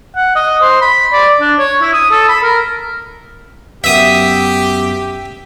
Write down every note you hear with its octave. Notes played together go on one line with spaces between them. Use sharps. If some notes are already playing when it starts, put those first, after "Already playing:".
F#5
D#5
C5
B5
D5
D4
C#5
E4
D#6
A4
B5
A#4
F#2 B3 G4 E5 D#6 B6